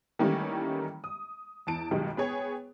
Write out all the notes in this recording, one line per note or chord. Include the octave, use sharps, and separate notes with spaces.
D#3 E3 G3 A3 A#3 C#4
D#6
E2 A5 D7
B1 B2 D#3 G3 G#3
B3 G#4 C#5 G5